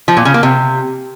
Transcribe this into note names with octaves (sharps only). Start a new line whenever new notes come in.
F3
A#2
C#3
A#3
C3